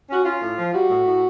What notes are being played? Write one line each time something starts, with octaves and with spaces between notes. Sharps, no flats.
C#4 F#4
C#4 F4
A2
F3
G3 F#4
A2
A2